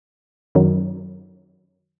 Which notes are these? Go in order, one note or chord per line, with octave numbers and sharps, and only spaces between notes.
F#2 D#3 F#3